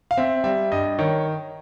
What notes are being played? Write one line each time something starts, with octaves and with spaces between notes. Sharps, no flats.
F5
C4 E5
G3 E5
G2 D#5
D#3 C#5